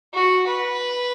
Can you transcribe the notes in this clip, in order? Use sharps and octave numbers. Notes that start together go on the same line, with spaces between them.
F#4
B4